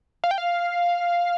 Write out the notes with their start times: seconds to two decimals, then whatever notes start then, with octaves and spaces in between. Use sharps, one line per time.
0.24 F5
0.31 G5
0.38 F5